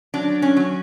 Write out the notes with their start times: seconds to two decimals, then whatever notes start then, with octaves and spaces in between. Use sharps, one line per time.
0.14 F#3 D4
0.42 C#4
0.56 F#3